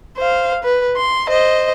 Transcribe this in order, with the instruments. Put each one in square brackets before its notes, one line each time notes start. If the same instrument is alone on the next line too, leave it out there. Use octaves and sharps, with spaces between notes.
[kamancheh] C5 F5
B4
C6
C5 D#5